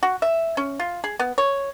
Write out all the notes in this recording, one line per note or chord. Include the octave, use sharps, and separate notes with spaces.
F#4
E5
C#4
F4
G#4
B3
C#5